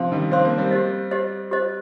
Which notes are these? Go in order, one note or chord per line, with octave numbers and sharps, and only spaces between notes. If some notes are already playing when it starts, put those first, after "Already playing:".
Already playing: C3 F3 G4 C5 F5 C6
D#3 G3
C4 G4 C5 F5 C6
A#3
G3 C4
G4 C5 D#5
G4 C5 D#5
G4 C5 D#5